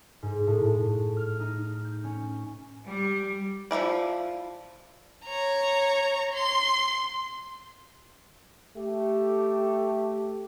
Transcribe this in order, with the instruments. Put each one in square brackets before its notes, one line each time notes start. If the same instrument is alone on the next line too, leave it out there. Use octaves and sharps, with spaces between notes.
[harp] G#2
A2
A2
F6
D#4
G6
C#4
[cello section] G3
[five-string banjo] F3 A3 E4 D5
[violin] C#5 A#5
C6
[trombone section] A3 G4